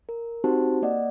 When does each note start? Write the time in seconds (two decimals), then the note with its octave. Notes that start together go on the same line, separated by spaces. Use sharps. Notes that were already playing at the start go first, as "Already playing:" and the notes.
0.09 A#4
0.44 C4 D#4 F#4 G4 C5 A5
0.82 A#3 D5 D#5 F#5